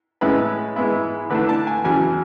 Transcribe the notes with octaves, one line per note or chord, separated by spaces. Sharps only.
A2 G#3 C#4 E4 B4
G#2 G#3 B3 E4
D3 A3 D4 B4
A5
G#5
E2 C#3 F#3 G#5